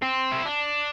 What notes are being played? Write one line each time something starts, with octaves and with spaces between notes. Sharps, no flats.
C4
E4
D4